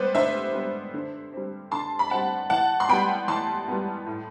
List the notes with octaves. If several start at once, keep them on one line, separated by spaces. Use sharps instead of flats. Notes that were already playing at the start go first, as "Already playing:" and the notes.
Already playing: G3 B3 B4 C5 D5
D3 C5 E5
G3 B3
D3
G3 C4
D3 A5 C6
B5
G3 C4 F#5 A5
E3 F#5 A5
C6
G3 B3 G5 B5
E3 A5 C6
G3 B3
A2